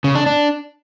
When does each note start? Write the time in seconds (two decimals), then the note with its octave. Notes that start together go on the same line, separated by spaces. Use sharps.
0.04 C#3
0.15 D4
0.26 D4